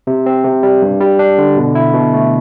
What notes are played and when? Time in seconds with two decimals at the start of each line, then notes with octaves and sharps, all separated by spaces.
0.07 C3
0.26 C4
0.44 C3
0.63 G3
0.82 G2
1.01 G3
1.19 D4
1.38 D3
1.57 B2
1.75 E4
1.94 B2
2.13 A3